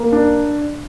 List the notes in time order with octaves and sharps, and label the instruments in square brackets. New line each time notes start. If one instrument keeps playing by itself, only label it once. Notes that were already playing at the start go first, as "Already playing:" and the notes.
Already playing: [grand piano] A#3
D4